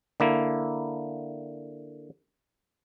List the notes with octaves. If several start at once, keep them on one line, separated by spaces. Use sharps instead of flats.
D3 A#3 E4